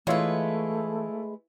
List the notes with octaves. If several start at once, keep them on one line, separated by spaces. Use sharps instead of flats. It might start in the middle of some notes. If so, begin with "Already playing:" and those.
E3 G#3 A3 E4 F4 B4 C#5